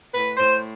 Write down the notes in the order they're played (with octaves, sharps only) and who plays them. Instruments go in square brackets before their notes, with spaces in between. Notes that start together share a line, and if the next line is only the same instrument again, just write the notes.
[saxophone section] A2 B4
A2 C5